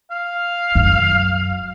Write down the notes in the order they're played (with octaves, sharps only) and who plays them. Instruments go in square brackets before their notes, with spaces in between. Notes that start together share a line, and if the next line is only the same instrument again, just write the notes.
[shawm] F5
[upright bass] F#2